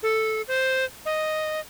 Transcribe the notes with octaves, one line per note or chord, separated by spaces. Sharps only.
A4
C5
D#5